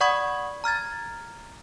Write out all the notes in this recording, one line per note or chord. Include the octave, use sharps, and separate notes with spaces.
D5 F#5 B5 C#6 D#6 G#6
A#5 F6 G#6 A6